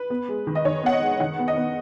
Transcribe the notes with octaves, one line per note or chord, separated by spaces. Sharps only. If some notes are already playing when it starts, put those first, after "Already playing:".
Already playing: B4
B3
G#3
D#3
D#5
D#3 C#5
B3 F#5
D#5
G#3
D#3 F#5
B3
D#5
B3